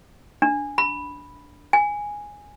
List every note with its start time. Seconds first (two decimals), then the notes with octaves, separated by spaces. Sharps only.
0.42 D4
0.78 B5
1.73 G#5